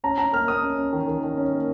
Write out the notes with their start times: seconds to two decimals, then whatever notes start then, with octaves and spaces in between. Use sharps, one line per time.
0.04 C#4 A#5
0.18 C#4 A#5
0.33 A#3 F6
0.48 A#3 D#6
0.63 C#4
0.78 C#4
0.93 D#3
1.08 D#3
1.23 D#3
1.37 C#4
1.52 A#3